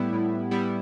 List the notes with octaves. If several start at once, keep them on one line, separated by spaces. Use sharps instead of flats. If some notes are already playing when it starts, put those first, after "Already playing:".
Already playing: A2 G3 B3 E4
A2
G3 B3 E4